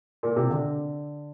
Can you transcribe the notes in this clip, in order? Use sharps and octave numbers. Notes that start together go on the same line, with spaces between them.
A#2
C3
D3